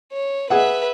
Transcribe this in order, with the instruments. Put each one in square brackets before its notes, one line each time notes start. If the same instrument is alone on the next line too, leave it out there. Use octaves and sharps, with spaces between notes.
[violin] C#5
[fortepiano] G#4 F#5 [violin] B4 E5